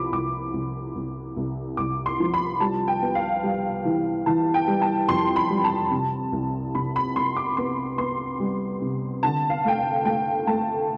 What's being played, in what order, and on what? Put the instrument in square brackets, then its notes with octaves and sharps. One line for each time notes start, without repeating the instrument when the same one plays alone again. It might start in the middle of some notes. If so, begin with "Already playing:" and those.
Already playing: [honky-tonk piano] C2 F3 B5 D6
C2 D6
C2
C2
C2
C2 D6
C6
F3
B5
G3 A5
G5
B3
F5
G3
E3
E3 A5
G5
G3
A5
F2 C6
B5
G3
A5
C3
C2
C3 B5
B5
C3 C6
D6
B3 C6
B3 C6
G3
C3
D3 A5
F5
A3 G5
F5
A3 G5
A3 A5